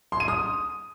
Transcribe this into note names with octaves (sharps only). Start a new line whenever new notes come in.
C6
D#7
D#6